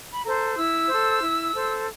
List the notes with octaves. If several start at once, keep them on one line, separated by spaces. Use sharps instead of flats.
B5
A4 C5 A#5
E4 E6
A4 C5
E4
A4 C5